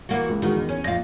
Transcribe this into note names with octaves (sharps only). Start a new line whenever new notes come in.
E3 A#3 F#4
C#2
D#3 E3 G#3 F#4
E2
C#4
F2 A#2 F5 A#6